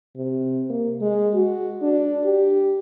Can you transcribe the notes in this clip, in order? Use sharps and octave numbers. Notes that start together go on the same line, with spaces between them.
C3
A#3
G#3
F#4
D4
G4